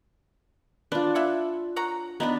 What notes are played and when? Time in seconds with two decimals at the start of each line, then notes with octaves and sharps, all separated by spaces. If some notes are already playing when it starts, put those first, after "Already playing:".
0.92 D4 F4 B4
1.15 E4 E5 F#5
1.76 C#5 F#5 A#5
2.20 B3 D4 D#4 B4 B5